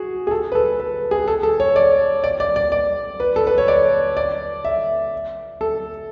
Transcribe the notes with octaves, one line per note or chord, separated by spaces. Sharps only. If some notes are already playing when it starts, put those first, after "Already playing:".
Already playing: F#4 G#4
G#4
A4
B4
A4
B4
G#4
A4
A4
C#5
D5
D5
D5
D5
D5
B4
A4
B4
C#5
D5
D5
E5
A4